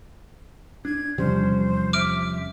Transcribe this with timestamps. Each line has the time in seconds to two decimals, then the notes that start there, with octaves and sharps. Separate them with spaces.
0.85 D4 G#6
1.18 E2 C3 F3 G3 C#4 C5
1.93 E5 D6 F6 D7